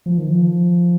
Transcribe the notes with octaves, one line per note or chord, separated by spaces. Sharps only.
F3
D#3
F3